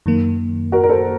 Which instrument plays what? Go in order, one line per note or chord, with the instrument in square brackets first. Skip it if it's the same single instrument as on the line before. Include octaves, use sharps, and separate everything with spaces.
[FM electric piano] F#2 D#3 A#3
[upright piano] F#4 A#4
A#4
A4 C5